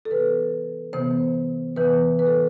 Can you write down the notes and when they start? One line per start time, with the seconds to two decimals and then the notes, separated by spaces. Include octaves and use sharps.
0.05 A4
0.11 C3 E3 B3 B4
0.93 C3 E3 B3 C5
1.76 C3 E3 B3 B4
2.19 B4
2.26 A4